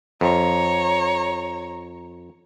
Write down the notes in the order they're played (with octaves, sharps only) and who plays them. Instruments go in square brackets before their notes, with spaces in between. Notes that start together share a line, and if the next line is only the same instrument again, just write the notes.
[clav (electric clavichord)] F2 [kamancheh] C#5 A#5